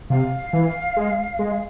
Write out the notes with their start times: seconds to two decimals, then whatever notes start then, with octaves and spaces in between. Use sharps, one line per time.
0.10 C3 F5
0.53 E3
0.97 G#3
1.39 G#3